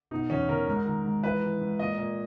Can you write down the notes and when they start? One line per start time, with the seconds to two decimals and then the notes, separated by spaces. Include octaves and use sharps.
0.11 B2 D#4
0.30 E2 C#4
0.49 E2 A#4
0.67 G#2
0.86 D#3
1.05 G#2
1.23 E3 B4
1.42 E3
1.61 G#2
1.79 A#2 D#5
1.98 A#2